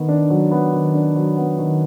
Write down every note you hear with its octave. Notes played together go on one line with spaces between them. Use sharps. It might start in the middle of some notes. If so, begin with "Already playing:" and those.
Already playing: D#3 B3
D4
F#3
B3
D#3
D4
F#3
B3
D#3